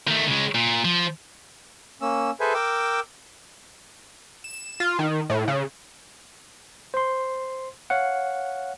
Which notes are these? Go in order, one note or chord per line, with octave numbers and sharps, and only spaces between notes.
D#3 A3
C#3 G#3
A#2
F3
A#3 C#4 E6
G#4 A4 B4 C5 E5 G#5
A#4 G5 D6 E6
E7
F4
D#3
A2
C#3
C5 C6
C#5 F5 F#5